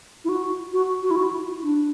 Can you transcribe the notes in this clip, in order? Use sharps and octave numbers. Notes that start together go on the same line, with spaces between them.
E4
F#4
F#4
F#4
E4
F#4
E4
D4